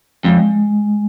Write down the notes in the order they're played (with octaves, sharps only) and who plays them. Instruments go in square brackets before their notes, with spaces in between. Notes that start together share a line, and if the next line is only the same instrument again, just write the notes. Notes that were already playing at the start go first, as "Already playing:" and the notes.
[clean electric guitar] F2 [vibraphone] G#3